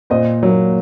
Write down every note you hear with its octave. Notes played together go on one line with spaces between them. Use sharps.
A#2 C5 D#5
F#3 A#3